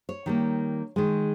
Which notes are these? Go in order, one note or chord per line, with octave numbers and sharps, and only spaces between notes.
C#5
D#3 G3 A#3
D#3 G#3